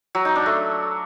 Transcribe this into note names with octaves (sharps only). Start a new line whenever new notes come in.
F#3
D#4
D4
A3